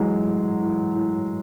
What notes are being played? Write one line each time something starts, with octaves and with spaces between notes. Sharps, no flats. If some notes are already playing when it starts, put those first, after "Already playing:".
Already playing: E3 F#3 G#3
A2
E3
A2